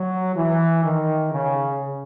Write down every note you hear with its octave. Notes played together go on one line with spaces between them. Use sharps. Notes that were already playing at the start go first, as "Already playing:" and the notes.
Already playing: F#3
E3
D#3
C#3